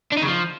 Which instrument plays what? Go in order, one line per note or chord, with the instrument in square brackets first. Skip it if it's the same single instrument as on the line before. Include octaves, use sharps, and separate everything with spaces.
[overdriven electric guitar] D4
D#4
C#3
F3